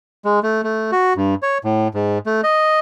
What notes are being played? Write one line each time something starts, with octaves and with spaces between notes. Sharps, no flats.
G#3
A3
A3
F#4
G2
C#5
A2
G#2
A3
D#5